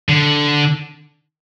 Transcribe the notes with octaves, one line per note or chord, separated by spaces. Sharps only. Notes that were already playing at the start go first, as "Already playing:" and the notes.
D3